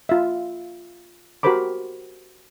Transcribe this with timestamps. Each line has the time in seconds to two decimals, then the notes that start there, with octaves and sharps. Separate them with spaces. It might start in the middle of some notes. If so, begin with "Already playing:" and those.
0.09 F4 E5
1.43 F#4 G4 A#4 C5 B5 D6